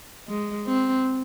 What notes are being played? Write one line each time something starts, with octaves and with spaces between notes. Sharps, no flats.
G#3
C4